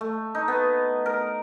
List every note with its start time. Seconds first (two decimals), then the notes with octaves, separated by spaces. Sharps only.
0.01 A3
0.35 D#4
0.48 B3
1.06 A#4